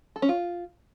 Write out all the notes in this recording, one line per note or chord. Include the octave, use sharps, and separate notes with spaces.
A4
C#4
F4